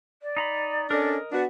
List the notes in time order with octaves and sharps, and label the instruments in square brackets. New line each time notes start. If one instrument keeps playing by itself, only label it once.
[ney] D5
[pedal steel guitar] D#4 A#5 B5
[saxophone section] C#4 D4 A4 [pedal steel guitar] A#4 D#5
[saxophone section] B3 D4 F#4 [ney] D5